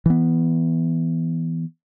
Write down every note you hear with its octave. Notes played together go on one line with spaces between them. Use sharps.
E3 B3